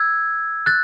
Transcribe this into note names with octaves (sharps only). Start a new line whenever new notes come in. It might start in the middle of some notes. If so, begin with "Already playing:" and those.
Already playing: E6 G#6
F#6 A6